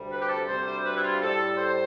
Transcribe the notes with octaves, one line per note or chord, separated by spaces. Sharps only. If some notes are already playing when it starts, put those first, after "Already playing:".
Already playing: D2 C3 G3
B4
G4
A4
D2 C3 G3 C5
C5
B4
E4
F4
A2 G3 A4
C5